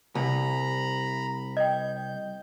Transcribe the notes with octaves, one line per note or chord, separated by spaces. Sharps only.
C2 A#5 B5
D#5 G5 G6